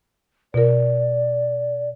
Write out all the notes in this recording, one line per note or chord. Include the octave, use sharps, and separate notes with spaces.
B2 F4 A#4 D5